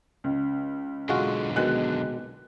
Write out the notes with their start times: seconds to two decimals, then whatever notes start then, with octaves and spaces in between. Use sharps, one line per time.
0.24 C#2
1.09 B1 D3 G#3 F4 F#4
1.56 B2 D#3 G#3 F#6